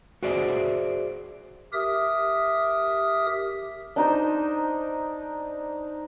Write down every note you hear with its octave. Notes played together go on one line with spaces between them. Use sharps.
F#4 G#4 C5 D5 E5
G4 A#4 E5 D#6
D4 D#4 C5